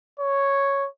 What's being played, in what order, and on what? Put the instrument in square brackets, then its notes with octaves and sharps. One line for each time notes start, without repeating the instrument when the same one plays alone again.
[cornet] C#5